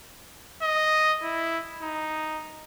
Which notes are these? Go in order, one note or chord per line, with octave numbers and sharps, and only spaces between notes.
D#5
E4
D#4